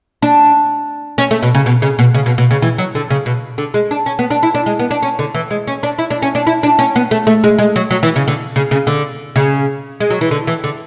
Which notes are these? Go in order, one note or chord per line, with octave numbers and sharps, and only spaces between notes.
D4
C#4
A3
B2
C#3
B2
C#3
B2
C#3
B2
B2
C#3
E3
F#3
D3
C#3
B2
D3
G#3
D4
C#4
B3
D4
E4
D4
G#3
B3
D4
C#4
D3
E3
G#3
C#4
D4
E4
D4
C#4
D4
E4
D4
C#4
B3
A3
A3
G#3
G#3
F#3
F#3
E3
C#3
D3
C#3
C#3
D3
C#3
G#3
F#3
E3
D3
E3
D3